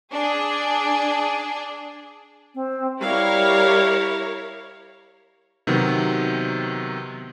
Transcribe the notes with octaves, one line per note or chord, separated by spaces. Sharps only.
D4 G#4
C4
G3 E4 G4 A#4 C#5 F5
C3 D#3 F#3 B3